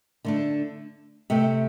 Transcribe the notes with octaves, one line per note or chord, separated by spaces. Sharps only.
D3 A3 D4
C3 A3 C4